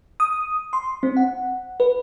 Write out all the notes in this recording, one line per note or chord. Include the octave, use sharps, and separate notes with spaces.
D#6
C6
C4
F#5
B4